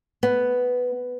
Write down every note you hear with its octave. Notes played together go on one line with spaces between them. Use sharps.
B3